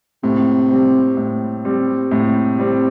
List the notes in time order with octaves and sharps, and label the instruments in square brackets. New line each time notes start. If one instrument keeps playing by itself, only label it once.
[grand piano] A2 [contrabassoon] C3
[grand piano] G3 C4
A2
G3 C4
[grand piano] A2 [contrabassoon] C3
[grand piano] G3 C4